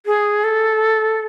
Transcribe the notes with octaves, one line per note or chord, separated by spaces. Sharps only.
G#4
A4